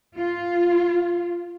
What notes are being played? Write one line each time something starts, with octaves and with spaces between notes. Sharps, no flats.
F4